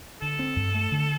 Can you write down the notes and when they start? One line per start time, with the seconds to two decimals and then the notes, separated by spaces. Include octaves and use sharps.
0.21 D3 A4
0.39 C4
0.56 G2
0.75 A3
0.91 D3